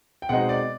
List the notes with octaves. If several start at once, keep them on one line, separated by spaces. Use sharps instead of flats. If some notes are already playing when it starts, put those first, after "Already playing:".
G5
B2 G#3 C4 D#4 F#5
D5